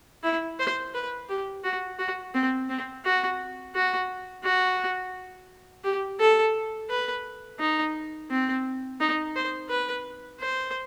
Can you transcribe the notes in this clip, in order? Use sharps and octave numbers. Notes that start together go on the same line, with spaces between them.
E4
C5
B4
G4
F#4
F#4
C4
C4
F#4
F#4
F#4
G4
A4
B4
D#4
C4
D#4
C5
B4
C5